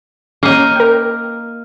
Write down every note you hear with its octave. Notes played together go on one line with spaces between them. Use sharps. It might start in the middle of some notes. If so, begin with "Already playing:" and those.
A#3 C#4 D#4
A#4 G5